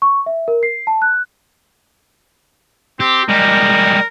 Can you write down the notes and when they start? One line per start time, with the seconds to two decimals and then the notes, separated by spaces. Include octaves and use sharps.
0.02 C#6
0.26 E5
0.48 A#4
0.63 C7
0.87 A5
1.02 F#6
3.00 C4 G4
3.29 G3 G#3 A#4